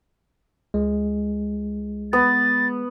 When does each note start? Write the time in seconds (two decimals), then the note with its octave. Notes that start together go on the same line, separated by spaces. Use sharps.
0.74 C#2 G#3
2.13 B3 A6